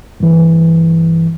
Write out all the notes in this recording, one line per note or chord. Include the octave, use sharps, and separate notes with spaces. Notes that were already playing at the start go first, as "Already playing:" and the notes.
G2 E3